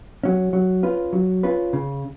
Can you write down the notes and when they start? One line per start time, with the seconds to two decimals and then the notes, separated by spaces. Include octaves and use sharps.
0.23 F#3 C#4
0.53 F#3
0.83 C#4 F4 B4
1.13 F#3
1.43 C#4 F4 B4
1.73 C#3